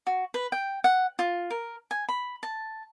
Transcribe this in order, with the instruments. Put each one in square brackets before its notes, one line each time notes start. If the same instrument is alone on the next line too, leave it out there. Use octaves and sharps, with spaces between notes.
[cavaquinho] F#4
B4
G5
F#5
F4
A#4
G#5
B5
A5